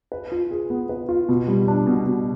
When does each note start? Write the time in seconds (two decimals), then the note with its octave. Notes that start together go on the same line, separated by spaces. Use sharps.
0.12 B4
0.32 F4
0.51 G#4
0.70 B3
0.89 B4
1.09 F4
1.29 B2
1.48 G3
1.68 D4
1.87 B2
2.06 B2